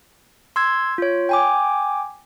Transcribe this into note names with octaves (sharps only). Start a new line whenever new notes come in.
C6 E6 G#6
F4 C#5
G5 G#5 D6